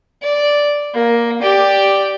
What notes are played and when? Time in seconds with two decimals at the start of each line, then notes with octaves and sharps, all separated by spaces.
0.22 D5
0.94 A#3
1.42 G4 D5